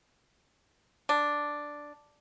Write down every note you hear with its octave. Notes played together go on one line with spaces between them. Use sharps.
D4